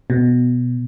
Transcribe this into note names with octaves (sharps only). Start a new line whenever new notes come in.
B2